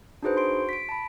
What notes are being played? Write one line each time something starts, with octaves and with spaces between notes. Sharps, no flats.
D4 D#4 F#4 G#4 B4 C5
F#4 C6 D7
B6 D7
A5 B5